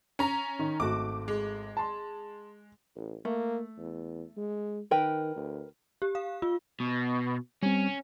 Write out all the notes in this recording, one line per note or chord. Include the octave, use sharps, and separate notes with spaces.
C#4 A#5
D#3
G#1 A3 F#4 D6
G#3
A5 C6
A1
A3 A#3
E2
G#3
D#3 A#4 B4 G5
D2
G4
F5
F4
B2
G3 C4 C#4